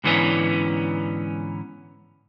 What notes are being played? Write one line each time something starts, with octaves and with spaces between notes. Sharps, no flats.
G#2 D3 E3 B3 C#4